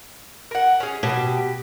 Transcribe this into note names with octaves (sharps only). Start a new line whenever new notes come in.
A#4 F#5
C#4 G#4
B2 G4